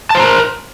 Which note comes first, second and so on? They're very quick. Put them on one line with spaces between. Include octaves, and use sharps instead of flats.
A5 C5 A#5 A#4